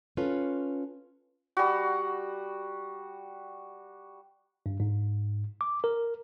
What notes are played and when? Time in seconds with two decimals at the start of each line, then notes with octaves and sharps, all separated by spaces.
0.17 C#4 F4 A4 B4 C#5
1.57 G3 F#4
4.66 G2
4.80 G#2
5.61 D6
5.84 A#4